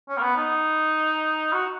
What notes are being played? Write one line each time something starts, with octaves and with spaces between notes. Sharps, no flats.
C#4
A#3
B3
D#4
F#4